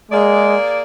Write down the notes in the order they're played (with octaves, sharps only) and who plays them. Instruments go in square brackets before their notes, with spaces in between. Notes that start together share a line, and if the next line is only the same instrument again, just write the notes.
[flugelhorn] G#3 [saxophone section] A#3 G#4 D5